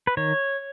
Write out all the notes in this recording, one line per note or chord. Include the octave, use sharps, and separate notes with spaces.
B4
D#3 C#5